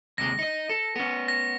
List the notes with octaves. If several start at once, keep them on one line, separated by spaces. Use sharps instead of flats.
D#2 C3 G#3 A#6
D#4 D#5
A4
B3 C#4
A#6